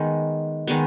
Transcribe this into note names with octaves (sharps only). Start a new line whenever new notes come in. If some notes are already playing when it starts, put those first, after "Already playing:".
Already playing: D#3 G#3 B3
D#3 G#3 B3